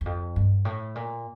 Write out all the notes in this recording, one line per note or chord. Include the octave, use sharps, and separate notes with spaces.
E2
F2
G2
A2
A#2